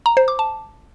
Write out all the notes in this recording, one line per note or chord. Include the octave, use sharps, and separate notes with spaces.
A#5
C5
D6
A5